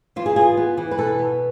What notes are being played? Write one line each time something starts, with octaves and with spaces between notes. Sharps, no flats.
E3 F4
G#4
F4 G#4
B3
E3
B4
B2 A4
B3